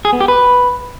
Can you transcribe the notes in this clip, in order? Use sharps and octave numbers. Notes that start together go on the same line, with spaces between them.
G#4
B3
G4
B4